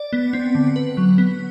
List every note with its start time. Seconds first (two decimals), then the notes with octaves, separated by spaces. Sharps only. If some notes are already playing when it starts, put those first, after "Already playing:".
Already playing: D5
0.13 B3
0.33 C4
0.55 D3
0.76 B4
0.97 F#3
1.18 B3